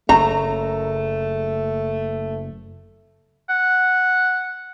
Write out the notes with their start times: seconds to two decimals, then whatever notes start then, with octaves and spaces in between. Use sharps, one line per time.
0.09 F#1 A3 A#5
3.50 F#5